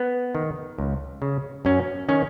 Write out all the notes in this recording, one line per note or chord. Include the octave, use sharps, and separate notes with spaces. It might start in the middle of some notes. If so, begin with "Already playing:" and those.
Already playing: B3
D#3
C#2
C#3
F#2 C#4
D#3 C#4